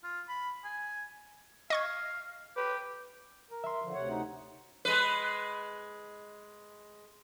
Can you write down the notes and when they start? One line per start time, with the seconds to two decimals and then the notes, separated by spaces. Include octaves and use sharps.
0.04 F4
0.29 B5
0.65 G#5
1.70 D#5 F5 C#6 G#6
2.56 G4 B4
3.51 A#4
3.64 E5 C6
3.82 D3 F3
3.94 D2 C3 C#5 F#5
4.10 D#4
4.85 G#3 B4